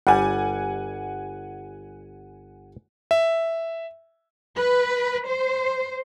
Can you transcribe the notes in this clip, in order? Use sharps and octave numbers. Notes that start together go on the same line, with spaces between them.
G1 G3 F#5 G#5
E5
B4
C5